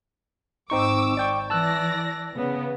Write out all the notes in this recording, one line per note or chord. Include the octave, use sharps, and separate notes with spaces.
G#1 C4 D#4 C#6 D6 E6
D5 G5 C#6
E3 D5 A5 E6 F#6 A#6
C#3 B3